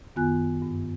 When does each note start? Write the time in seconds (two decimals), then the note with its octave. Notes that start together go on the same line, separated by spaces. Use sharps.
0.16 F#2 D#3 B3 F4 G#5 F#6
0.62 G2